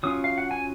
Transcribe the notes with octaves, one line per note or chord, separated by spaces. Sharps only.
F#3 C#4 F4 D#6
F5
F#5
G#5